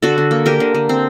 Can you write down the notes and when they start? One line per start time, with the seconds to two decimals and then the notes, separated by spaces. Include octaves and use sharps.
0.02 D3 F#4 A4
0.18 D3
0.31 A#3
0.46 D3 G4 A#4
0.60 D3
0.75 D3
0.89 C4